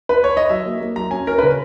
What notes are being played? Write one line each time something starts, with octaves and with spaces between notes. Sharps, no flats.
B4
C#5
D#5
F#3 E5
A#3
A#3
F#3 A#5
C#4 G#5
C#4 A#4
C#3 B4